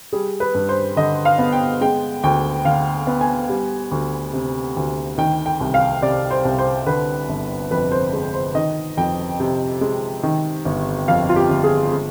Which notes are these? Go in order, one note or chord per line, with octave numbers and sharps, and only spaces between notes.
G3 G#4
B4
G2
C5
D3 D#5
F5
B3
G5
G#3 G5
D2 G5
D3 F5
B3
G#5
G3
D2
C3
D2
D#3 G5
G5
C2
F5
C3 D5
C5
C2
C5
D3 B4
G1
F2 B4
C5
G#3
C5
D#3 D#5
F2 G5
C3
G#3
D#3
G1
F2 F5
F4
G4
G1
G#4
G#3